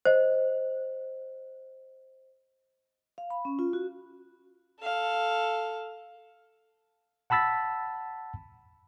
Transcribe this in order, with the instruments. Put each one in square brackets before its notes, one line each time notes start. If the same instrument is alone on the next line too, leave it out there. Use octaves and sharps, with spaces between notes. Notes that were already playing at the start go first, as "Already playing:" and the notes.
[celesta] C5 D#5
[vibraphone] F5
B5
C#4
F4
F#4
[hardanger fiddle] A4 F5
[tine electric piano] F#5 A5 B5 E6 A6 B6